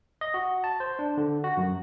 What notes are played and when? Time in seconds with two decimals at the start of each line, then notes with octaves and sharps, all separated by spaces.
0.21 D#5
0.34 F#4
0.64 A5
0.80 C5
0.99 D4
1.17 D3
1.44 F#4
1.57 F#2